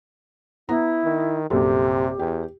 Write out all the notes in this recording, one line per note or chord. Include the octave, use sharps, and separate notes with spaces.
B3 E4 A#5
D#3
A#1 F#2 C3 G4 A4
E2 G4